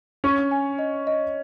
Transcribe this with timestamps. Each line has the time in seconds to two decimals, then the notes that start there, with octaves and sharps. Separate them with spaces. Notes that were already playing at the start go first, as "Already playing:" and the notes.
0.24 C#4 C#5 C#6
0.51 G#5
0.79 D#5
1.07 D#5